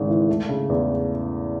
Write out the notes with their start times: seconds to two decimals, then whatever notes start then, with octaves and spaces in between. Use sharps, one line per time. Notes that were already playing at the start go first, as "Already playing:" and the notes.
Already playing: G#1 G#2 C#3 G#3
0.08 E3
0.28 A3
0.49 C#3
0.69 E2